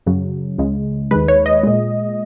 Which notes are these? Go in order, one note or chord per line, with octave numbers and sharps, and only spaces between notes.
F#2 C#3 F#3
C#2 C#3 G#3
D#2 D#3 G#3 B4
C#5
D#5
A#2 G#3